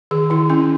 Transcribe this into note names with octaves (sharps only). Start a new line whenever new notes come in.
D#3 G#4
D#3 E4
C#4 E4